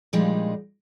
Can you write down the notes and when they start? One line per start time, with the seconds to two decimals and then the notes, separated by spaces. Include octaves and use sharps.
0.13 A#2 F3 G3 G#3 D4 D#4